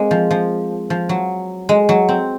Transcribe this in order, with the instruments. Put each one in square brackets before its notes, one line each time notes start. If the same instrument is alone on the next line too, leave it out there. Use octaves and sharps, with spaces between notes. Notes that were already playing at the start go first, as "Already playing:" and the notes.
Already playing: [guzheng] G#3 A#3 C4
F3
F3
F3
F#3
G#3
F#3
C4